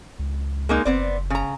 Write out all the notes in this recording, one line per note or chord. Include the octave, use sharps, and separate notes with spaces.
C#2
G#3 A#3 D#4
F#1 B3 C4 D5
C#3 A#5